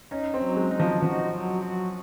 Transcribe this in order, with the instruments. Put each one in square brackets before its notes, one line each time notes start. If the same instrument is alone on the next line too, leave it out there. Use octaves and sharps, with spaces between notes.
[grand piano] C#4 [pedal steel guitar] D#4
[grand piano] C4
[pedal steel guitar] F#3
[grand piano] G#3
[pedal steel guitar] D#4
[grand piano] F3
[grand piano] F3 [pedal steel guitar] F#4
[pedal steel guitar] F#3
F#4